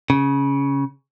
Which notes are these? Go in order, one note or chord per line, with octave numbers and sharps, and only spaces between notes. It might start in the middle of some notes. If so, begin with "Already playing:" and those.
C#3